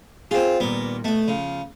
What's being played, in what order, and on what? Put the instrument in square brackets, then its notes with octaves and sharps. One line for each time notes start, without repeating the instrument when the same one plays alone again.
[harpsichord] C4 F4 [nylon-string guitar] G#4
[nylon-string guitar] A#2 D#3 G3 [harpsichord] B3
[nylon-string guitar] B2 B3 [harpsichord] A3
[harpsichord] C#3 [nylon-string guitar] F3